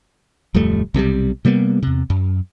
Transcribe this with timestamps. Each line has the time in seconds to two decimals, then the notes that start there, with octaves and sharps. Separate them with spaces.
0.54 D1 F2 G3 A3
0.94 B1 C3 F#3 G3
1.45 C3 G3 A#3 B3
1.83 E2 C3
2.10 F#2